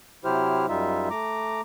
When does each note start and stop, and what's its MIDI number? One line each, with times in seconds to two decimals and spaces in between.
0.25 0.66 48
0.25 0.66 54
0.25 0.66 64
0.25 0.66 67
0.25 0.66 72
0.25 0.66 89
0.68 1.09 42
0.68 1.09 55
0.68 1.09 63
0.68 1.09 65
0.68 1.09 76
1.10 1.61 57
1.10 1.61 82
1.10 1.61 86